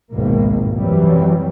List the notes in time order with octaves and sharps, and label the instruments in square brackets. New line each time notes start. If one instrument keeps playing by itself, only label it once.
[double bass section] G#1 C#2 G#2 B2 A#3
F#2 C3 E3 F#3 G3